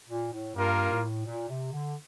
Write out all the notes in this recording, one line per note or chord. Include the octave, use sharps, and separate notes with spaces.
A#2
A2
G2 G3 A#3 F4 A#4
A2
A#2
C3
D3